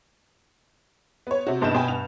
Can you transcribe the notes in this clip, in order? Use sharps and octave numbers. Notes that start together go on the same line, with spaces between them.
B3 C#5
C3 F#4
A#1 G2 B2 D#4 G6 E7
B2 G5 G#5 B5
G2 F7